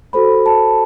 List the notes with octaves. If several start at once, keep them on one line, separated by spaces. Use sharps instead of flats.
F#4 A4 C5 B5
A5